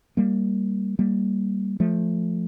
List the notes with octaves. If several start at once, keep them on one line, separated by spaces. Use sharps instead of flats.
G3 A#3
G3 A#3
F3 A3